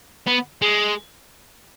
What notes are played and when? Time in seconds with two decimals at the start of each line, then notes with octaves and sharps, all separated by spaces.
0.27 B3
0.62 G#3